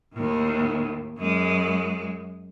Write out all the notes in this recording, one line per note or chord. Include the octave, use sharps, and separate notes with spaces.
D#2 A2
F#2 G#3